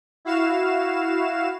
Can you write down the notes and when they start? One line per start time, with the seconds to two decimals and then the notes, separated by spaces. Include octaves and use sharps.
0.25 E4 F#4 F5 E7